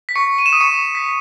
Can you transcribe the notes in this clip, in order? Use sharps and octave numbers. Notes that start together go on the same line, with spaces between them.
B6
C#6 C#7
D#7
E7
D#6 D#7
C#6 C#7
B6